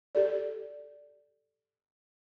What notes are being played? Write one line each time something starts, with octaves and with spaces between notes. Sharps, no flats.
G4 A4 D5